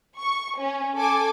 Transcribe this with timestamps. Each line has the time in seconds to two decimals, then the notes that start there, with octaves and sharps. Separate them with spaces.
0.19 C#6
0.60 C#4
0.96 A4 G#5 D6